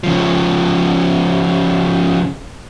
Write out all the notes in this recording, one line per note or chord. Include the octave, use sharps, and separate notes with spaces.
C#3 F3